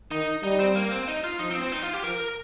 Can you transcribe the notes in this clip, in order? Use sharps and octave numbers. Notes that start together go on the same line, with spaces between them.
D#3 D#4
G3 D#4
C4
A#3
C4
D#4
F4
F3 D#4
C4
C4
D#4
F4
G4
F3 A#4